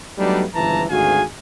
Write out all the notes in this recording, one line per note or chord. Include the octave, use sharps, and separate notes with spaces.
F#3 G3 A3 B3 D4 D#4
G1 C#2 E3 F3 A5 A#5
G#1 D2 F#4 G#4 F5 G#5